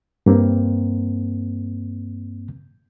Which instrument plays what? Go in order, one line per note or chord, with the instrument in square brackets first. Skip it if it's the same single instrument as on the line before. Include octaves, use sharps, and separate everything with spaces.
[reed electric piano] G2 A#3 C4